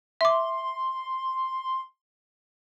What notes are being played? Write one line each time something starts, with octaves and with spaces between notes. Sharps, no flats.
E5 C6 D6